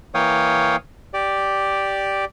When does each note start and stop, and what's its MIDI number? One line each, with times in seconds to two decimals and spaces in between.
0.15 0.76 52
0.15 0.76 58
0.15 0.76 73
0.15 0.76 77
0.15 0.76 79
0.15 0.76 87
1.14 2.25 67
1.14 2.25 74